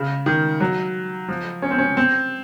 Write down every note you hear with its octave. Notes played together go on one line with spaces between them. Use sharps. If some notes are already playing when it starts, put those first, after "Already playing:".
Already playing: C#3
D#3
F#3
F3
C#4
C4
C#4
C4